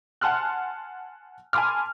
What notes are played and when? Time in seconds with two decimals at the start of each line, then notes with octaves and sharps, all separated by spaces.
0.21 F#5 G#5 A5 C6 F6 F#6
1.53 G#5 A5 B5 C6 D6 F6